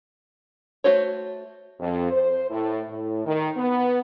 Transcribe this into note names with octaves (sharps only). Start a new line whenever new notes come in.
A3 F#4 C5 C#5
F2
C5
A2
A2
D#3
B3